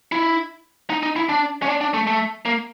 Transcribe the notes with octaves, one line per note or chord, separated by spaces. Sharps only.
E4
D#4
D#4
E4
D4
C#4
D4
D4
A3
A3
A#3